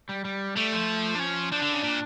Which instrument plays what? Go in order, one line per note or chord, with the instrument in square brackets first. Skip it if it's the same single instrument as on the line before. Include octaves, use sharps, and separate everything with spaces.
[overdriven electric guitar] G3
G3
[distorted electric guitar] G3 [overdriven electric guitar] A3
[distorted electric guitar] F3
[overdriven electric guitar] D4
C#4
[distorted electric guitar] F3 [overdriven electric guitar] D4
[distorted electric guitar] D3
C#3
A#2